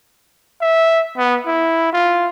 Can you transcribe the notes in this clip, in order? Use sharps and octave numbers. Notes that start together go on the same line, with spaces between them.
E5
B3
E4
F4